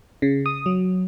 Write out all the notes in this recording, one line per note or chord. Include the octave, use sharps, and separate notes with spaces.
C#3
D#6
F#3